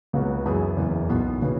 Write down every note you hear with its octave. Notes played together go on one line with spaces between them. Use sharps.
C#2 C#3 F#3 B3 F#4
F#2 E3 B3 E4 G#4
F#1 E2 C#3
B1 B2 B3
C#3 E3